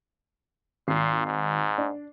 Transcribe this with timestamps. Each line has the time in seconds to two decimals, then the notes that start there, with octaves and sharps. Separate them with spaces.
0.88 G#1 A#2 C7
1.26 G#2
1.78 D4